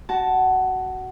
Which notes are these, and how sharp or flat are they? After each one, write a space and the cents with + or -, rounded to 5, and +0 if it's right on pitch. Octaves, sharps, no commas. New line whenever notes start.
F#4 +15 A5 +0